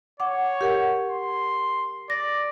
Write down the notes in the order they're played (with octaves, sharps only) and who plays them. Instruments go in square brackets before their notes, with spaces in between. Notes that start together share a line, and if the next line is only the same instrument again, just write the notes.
[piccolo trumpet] C#5 [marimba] F#5 D6
[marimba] G4 A#4 F#5
[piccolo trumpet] C6
[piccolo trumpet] D5 [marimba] A#6